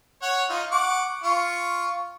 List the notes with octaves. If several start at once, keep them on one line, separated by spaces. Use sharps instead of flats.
C#5 F#5
D#4 F4
F#5 C#6 D6
F4 C#6